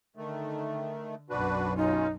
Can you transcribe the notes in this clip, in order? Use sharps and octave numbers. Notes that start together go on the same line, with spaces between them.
D3 D#3 A3
B1 F#2 D4 F#4 B4
B2 C#4 D#4 F4